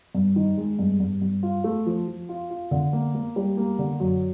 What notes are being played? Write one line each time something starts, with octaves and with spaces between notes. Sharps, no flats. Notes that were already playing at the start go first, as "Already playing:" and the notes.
G2
D#3
G#3
G2
G2
G2
F4
A3
F3
F3
F4
F4
D3
A#3
A#3
G3
A#3
D3
F#2